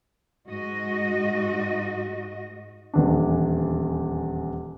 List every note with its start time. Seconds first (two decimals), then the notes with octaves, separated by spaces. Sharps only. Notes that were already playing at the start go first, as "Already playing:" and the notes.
0.48 G#2 F#4 D#5
2.94 D#1 E2 D4